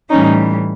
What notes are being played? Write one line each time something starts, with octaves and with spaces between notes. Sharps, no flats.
A2 E3 G3 C#4 D#4